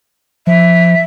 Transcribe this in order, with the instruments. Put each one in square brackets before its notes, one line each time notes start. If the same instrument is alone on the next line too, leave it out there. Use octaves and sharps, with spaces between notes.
[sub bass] F3 [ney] E5